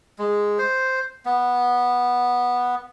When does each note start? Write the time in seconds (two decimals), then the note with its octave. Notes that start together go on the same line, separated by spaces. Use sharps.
0.18 G#3
0.59 C5
1.25 B3